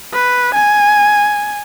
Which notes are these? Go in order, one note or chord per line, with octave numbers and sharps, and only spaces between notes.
B4
G#5